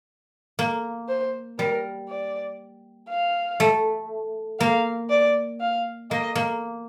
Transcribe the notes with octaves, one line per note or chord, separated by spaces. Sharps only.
A#3
C5
G3 A#4
D5
F5
A3
A#3 F5
D5
F5
A#3 D#5
A#3